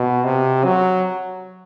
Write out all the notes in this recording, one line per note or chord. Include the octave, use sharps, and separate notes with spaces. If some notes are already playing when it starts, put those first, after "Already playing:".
Already playing: B2
C3
F#3